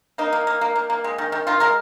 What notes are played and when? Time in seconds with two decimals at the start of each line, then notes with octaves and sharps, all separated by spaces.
0.18 A#3 D#4
0.33 A#3
0.47 A#3
0.61 A#3
0.76 A#3
0.90 A#3
1.04 G#3
1.18 D#3
1.32 D#3
1.47 D#3 F4
1.60 G#3 A#4